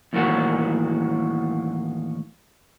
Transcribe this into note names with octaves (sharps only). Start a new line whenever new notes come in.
E2 A2 D#3 A#3 F#4